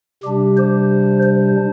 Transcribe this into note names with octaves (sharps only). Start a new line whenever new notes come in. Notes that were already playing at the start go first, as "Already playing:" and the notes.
C3 G3 D4 G4
C5
C5